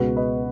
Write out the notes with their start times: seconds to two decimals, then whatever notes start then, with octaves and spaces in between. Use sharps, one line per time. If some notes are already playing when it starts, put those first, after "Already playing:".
Already playing: C#2 B2 G#3 F#4 B4
0.17 B4 D#5